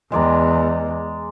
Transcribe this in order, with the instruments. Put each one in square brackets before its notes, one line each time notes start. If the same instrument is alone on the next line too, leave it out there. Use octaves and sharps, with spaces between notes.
[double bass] E2 [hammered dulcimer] G#3 D5 A#5